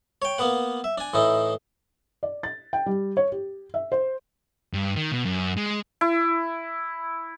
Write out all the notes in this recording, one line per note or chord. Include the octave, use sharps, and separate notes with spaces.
C#5 G5
A#3 B3 B4 F#5
E5
D4 G#5
A2 E3 D#4 E4
D5
A6
G5
G3
C#5
G4
E5
C5
G2
D#3
B2
F#2
G#3
E4